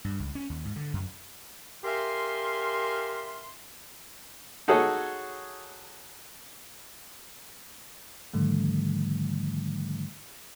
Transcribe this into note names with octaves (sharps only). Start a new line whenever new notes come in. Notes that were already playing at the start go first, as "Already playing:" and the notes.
G2
C#2
C#4
D#2
G#2
D3
F#2
G4 A#4 E5 F5 G#5 C6
D#4 F#4 G#4 A4 C#5
G#2 D3 D#3 F3 G3 A3